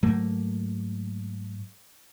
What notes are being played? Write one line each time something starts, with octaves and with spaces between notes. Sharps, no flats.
G#2 F#3 A3 A#3